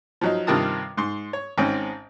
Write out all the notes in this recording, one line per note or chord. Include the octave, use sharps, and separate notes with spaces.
F3 F#3 D#4
G2 C3 D#3 F4 A5 D#6
G#2 C6
C#5
G#1 G#2 C4 C#4